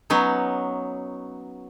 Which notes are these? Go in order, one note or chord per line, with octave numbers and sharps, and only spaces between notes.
F#3 B3 C#4 D#4